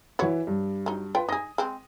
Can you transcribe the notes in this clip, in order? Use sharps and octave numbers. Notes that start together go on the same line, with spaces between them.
E3 F#4 B4 C#5
G2
F#3 D#4
F4 B4 G5
D#4 G#4 D#6 A#6
G#3 C4